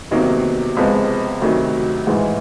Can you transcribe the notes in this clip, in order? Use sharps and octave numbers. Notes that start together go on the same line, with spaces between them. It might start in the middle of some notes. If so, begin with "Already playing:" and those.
E2 C3 D#3 F#3 A#3
C#2 C3 F3 G#3 B3
D2 C3 D#3 F#3
A1 G#2 E3 G#3